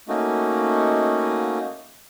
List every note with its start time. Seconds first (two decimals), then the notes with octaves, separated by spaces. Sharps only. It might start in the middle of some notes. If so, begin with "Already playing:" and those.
0.08 A3 A#3 C#4 D#4 F#4